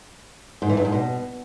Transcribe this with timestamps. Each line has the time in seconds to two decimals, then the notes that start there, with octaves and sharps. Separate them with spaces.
0.62 G#2
0.69 E3
0.77 G2
0.85 G#2
0.92 B2